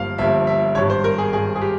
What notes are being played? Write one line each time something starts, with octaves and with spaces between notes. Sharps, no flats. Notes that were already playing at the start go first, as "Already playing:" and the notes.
Already playing: G1 G2 F3 A#3 F5
G1 G2 F3 A#3 E5
E5
G#1 G2 G3 C#5
C5
A#4
G#4
G#1 G2 G3 G#4
G#4
G4